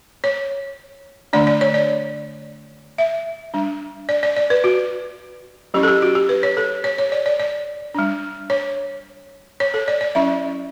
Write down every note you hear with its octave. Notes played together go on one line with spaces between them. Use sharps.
C#5
D3 A3 D4 D5
D5
C#5
D5
E5
G3 D4
D5
D5
D5
B4
F#4
F#3 C#4 E4 G4
A4
G4
F#4
G4
B4
C#5
A4
C#5
C#5
D5
D5
D5
G3 D4
C#5
C#5
A4
D5
D5
F#3 C#4 E4 E5